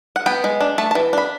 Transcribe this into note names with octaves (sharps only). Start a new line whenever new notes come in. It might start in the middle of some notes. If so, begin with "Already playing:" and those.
F#5
B3 G5
G#3
D4
A3 A5
A5
E3
D4 B5